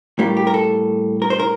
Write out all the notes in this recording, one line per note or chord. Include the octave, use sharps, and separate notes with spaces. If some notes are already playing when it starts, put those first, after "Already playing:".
A2 G3 A#3
G4
A#4
A4
A#4
C5
A#4